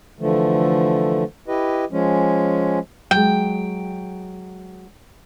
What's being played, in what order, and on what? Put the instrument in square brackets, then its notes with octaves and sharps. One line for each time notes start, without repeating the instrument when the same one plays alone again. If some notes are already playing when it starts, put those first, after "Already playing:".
[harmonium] D3 E3 F3 A3
E4 G4 B4 D#5
F3 G#3 C#4
[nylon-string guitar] F#3 G#3 [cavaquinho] G5